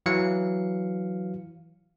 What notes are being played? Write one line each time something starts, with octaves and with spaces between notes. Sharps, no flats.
E3 F#3 F5 C#7